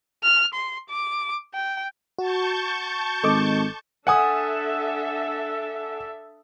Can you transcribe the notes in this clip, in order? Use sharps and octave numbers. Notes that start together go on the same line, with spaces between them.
F6
C6
D6
G5
F#4 A5 C#6 G6
G#1 A4 D#5 D6
D4 A4 E5 F#5 G#5 D#6